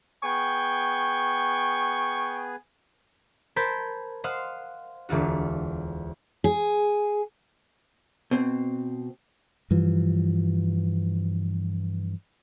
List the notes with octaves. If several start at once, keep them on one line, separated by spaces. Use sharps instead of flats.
B3 G#4 G5 C#6
A#4 C5 A5 B5 G6 G#6
C5 D#5 F5 F#5 C6
E1 D2 F4 F#4
G#4
B2 C4
G2 E3 F3